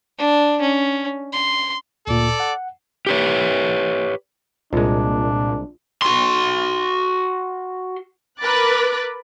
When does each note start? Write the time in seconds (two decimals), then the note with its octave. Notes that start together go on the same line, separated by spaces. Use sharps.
0.18 D4
0.61 C#4
1.33 C6
2.07 D2 A#2 A4 D5
2.40 F#5
3.07 G4 B4 C#5
4.73 C2 A#2 G#3 D4 F4 A#4
6.02 F#4 C6
8.39 A#4 B4 B5 D6 F#6 A6